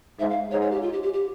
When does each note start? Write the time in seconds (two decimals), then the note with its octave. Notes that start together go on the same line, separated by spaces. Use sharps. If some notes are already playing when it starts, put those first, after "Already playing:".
0.20 G#2 E5
0.30 F5
0.51 G#2 C#5
0.62 C#5
0.71 G4
0.82 F4
0.93 G4
1.03 G4
1.13 G4